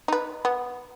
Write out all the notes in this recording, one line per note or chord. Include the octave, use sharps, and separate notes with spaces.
D#4 B4
B3